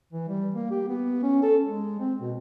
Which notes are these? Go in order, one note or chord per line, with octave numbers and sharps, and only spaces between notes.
E3
G3
A#3
G4
B3
C#4
A4
G#3
C4
B2